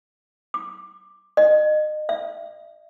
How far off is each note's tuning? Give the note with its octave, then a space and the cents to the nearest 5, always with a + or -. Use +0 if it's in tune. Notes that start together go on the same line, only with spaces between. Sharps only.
D6 +10
D#5 -30
E5 +30